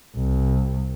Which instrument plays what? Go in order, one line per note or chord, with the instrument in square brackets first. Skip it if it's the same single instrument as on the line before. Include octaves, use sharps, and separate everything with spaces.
[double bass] C2